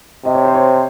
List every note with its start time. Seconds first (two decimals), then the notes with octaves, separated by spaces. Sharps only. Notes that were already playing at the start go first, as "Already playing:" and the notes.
0.25 C3 D#5
0.35 C#5
0.45 C5
0.54 C#5